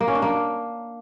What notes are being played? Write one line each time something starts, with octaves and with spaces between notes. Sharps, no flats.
A#3
C#4
D4
A#3